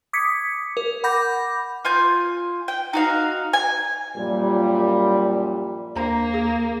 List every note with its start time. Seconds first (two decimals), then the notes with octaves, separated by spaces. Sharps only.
0.13 D6 D#6 G#6 B6 C#7
0.77 A#4
1.04 F#5 B5 D6 G6 A#6
1.85 F4 G#5 G6
2.68 G5
2.93 D#4 F#4 F5
3.53 G#5
4.17 F#2 A#2 F3 G3
5.95 D#2 A#3 D4 C5 A#5
6.33 G#4